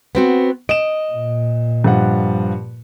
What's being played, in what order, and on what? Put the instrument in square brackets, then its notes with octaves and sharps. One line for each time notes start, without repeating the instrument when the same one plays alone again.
[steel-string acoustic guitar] B3 C4 F#4
[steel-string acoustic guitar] D#5 [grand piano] D7 E7
[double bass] A#2
[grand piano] G2 F3 F#5